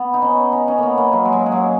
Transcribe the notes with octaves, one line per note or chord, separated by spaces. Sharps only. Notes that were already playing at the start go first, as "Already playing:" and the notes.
Already playing: B3
D#4
C#4
D#4
C#4
A#3 B3
A#3
F#3
G#3
F#3
G#3
F#3